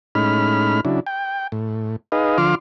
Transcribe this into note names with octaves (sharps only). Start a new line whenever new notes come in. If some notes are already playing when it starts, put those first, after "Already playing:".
A2 G#3 C#4 D#4 B5 F6
C#3 F#3 D4 E4
G5
A2
D#4 G#4 B4 D#5 F5
D3 F3 F4 C6 D6 F6